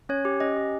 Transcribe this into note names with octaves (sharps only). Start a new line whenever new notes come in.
C#4 C#5
G4
C#4 D#5
G4